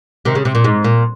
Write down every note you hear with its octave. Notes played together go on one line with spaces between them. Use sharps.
C3 D#3
C#3
C3
A#2
G#2
A#2